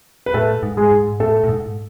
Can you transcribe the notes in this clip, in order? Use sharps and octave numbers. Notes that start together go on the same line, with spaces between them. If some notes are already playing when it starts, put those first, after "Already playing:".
B4
A2 A3 A4
G#2
G#3 G#4
G#2
A2 A3 A4
A2
G#2